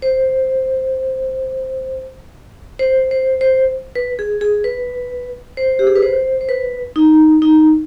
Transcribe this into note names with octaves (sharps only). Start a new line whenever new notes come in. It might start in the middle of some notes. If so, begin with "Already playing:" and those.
C5
C5
C5
C5
B4
G#4
G#4
B4
C5
G4
G#4
B4
C5
C5
B4
D#4
D#4